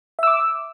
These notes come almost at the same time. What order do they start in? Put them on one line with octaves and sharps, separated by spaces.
E5 E6 D6